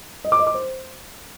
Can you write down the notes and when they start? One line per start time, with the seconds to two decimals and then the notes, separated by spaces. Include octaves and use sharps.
0.25 D#5
0.32 D6
0.39 D#5
0.47 D6
0.54 C5